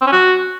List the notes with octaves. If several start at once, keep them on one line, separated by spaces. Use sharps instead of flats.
C4
C#4
F#4